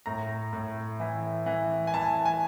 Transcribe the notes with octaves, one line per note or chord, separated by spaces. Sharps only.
A2 A#5
A2
E3
E3
G#5
E3 A5
G#5